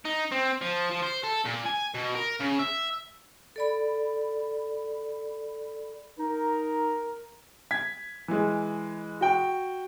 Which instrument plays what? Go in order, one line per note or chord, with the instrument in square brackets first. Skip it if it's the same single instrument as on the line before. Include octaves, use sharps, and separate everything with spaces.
[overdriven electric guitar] D#4
C4
F3
F3
C5
A4
A#2
G#5
B2
A#4
C#3
E5
[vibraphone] A4 D5 B5
[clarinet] D#4 [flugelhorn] A#4
[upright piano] G#6 B6
E3 G#3
[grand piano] F#4 G5